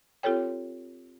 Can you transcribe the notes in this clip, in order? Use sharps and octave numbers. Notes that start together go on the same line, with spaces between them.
C4 F4 G4 A4 C#5 G5